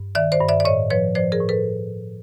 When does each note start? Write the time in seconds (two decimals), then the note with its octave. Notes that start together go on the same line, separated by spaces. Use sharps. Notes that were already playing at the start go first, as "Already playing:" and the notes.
Already playing: G2
0.15 D#3 D5 E5
0.32 C5 D5
0.40 G2
0.49 D5 E5
0.60 D5
0.65 A2 C#5 D#5
0.90 F3 B4 C#5
1.15 F3 C5 D5
1.32 G#4 A#4
1.40 A2
1.49 A4 B4